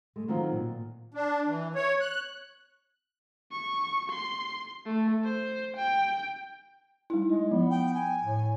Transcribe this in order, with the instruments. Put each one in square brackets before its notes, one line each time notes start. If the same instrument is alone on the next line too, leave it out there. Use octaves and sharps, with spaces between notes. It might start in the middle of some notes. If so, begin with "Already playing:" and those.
[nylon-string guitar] G#3 A3
D#3 F#3 C4 F4
A#2
[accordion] D4
E3
C#5
F#6
[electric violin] C#6
C6
A3
C5
G5
[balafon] G3 D#4 E4
[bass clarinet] G#3 [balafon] D#4
[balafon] F3 [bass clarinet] B3
[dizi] G5
G#5
[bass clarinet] A2